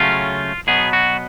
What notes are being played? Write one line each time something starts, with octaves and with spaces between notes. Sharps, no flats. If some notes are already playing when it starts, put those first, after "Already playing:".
Already playing: C#3 F#3 A3 C#4 F4
B2 F#3 B3 G#4
F#4